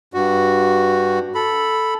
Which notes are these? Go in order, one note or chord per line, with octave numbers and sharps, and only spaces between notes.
G2 F#4
A4 B5